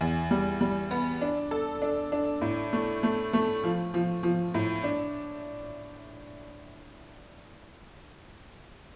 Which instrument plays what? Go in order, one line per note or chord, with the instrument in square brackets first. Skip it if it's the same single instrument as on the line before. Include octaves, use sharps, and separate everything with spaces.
[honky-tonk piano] E2
G3
G3
B3
D4
A4
D4
D4
A2
A3
A3
A3
F3
F3
F3
A2
D4